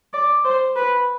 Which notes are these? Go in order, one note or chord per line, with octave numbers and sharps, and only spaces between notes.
D5
C5
B4